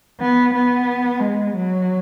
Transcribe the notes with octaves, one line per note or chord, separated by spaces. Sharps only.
B3
B3
G#3
F#3